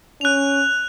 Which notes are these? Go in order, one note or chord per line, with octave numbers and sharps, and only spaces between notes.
C#4 F#6 F7